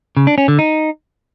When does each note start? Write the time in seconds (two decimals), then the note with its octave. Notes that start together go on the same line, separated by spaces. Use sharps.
0.17 C#3
0.27 D4
0.38 C#4
0.48 D3
0.59 D#4